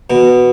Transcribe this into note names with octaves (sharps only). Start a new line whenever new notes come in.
B2